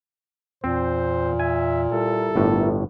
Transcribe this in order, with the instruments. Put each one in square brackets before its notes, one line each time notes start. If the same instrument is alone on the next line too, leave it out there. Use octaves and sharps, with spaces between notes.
[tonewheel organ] E2 [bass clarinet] A#2 [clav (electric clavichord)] C4 [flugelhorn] C5
[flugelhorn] E5 [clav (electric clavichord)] G#5
[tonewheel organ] G3 E4 A#4 [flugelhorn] A4
[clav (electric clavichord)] G1 A2